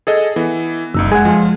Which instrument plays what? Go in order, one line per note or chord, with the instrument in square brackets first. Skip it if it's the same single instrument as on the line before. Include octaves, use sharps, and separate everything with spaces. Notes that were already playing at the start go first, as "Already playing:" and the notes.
[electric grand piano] G#4 A4 D#5
E3 B3
[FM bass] F#1 [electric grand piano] C2 D#4 E6
[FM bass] G#3 [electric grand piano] F#5 G#5
[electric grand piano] F3 F4